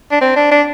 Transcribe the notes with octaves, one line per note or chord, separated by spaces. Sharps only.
D4
C4
D4
D4